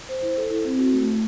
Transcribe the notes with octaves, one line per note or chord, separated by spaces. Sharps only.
C5
E4
A4
E4
C4
F#4
A3
A3